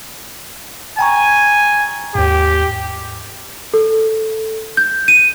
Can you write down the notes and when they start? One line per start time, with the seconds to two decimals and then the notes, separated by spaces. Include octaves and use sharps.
0.99 G5 G#5 A#5 C#6
2.15 D#2 G#2 G4
3.74 A4
4.77 G6
5.08 D#7